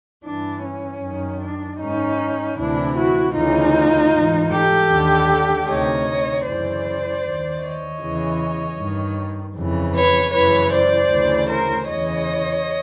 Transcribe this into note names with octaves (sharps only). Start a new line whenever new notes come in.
G2 E3 D4
C#4
F#2 D#3
D4
G#2 D#3 C#4 D#4
D2 C3 E3 D4 E4
E4 F#4
D2 C#3 E3 D#4 F4
G#2 E3
G4 A4
D#2 D3
D2 C3 D#3 C#5 D#5
F#2 C#3 E3 C5 D5
D#2 D#3
C#5 D#5
E2 C#3 E3
G2 D#3
F2 C#3 E3
B4 C#5
F#2 C#3 E3 B4 C#5
C5 D5
D2 C#3 E3
A#4 C5
E2 C#3 E3 C#5 D#5